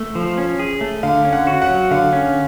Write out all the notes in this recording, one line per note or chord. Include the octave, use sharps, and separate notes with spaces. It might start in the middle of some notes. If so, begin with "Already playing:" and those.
Already playing: A3
F3
C#4
G#4
A3
D3 F5
C#4
F#5
F#4
F#5
F#3
D3 F5
C#4